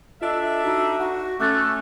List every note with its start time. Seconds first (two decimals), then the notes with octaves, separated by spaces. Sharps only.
0.21 D4 F4 A4 D#5 E5
0.64 D#4 F#4
1.00 F#4 F#5
1.40 A3 C#4 D6 F#6 A6